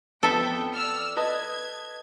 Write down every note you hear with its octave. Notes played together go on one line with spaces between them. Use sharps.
F2 B3 A4 E5 G5 A5
D5 E6 F6
B4 D#5 A5 G#6